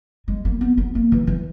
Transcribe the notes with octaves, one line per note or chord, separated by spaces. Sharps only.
G#3
A#3
B3
B3
A#3
E3
E3